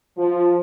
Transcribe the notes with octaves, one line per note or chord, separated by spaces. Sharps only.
F3